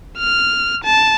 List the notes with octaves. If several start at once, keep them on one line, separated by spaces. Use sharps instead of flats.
F6
A5